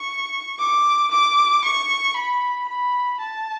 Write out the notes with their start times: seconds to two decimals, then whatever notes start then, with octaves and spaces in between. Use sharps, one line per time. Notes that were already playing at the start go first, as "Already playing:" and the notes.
Already playing: C#6
0.59 D6
1.11 D6
1.64 C#6
2.16 B5
2.68 B5
3.20 A5